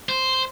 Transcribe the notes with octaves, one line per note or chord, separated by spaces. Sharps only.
C5